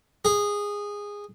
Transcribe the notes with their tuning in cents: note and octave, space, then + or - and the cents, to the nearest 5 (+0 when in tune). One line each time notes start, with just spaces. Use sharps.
G#4 -15